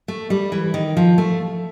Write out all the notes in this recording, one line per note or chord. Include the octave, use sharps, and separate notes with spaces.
A3
G3
E3
D#3
F3
A3